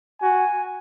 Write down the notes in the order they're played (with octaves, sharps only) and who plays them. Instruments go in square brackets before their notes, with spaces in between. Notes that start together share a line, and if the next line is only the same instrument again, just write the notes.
[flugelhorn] F#4 [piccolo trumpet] G#5